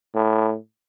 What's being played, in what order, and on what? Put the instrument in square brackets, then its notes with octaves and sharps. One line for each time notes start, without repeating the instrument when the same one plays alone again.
[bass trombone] A2